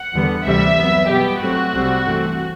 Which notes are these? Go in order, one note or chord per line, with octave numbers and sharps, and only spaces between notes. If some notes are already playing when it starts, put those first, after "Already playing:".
Already playing: F#5
E2 D3 G3 B3
D2 C3 E3 G3 C4 E5
F#2 F#3 B3
B2 G3 B3 G4
G2 F#3 A3 C4 F#4
C2 C3 G3 C4
G2 E3 A3 C4